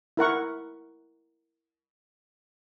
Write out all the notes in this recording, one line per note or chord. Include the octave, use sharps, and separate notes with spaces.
E4 A#4 F#5 C#6